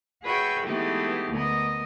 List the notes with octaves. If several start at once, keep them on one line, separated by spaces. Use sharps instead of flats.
F#4 G#4 B4 C#5 E5 G5
E3 G#3 A3 B3 D#4 G4
D2 B3 A#4 D#5